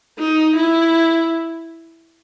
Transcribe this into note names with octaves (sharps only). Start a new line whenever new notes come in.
D#4
E4